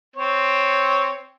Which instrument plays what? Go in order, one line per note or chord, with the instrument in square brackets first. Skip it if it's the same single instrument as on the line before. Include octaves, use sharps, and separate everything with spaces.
[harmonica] C4 C#5